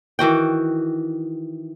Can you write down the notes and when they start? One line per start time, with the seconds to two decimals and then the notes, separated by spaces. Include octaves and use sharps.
0.19 D#3 E3 F#4 G5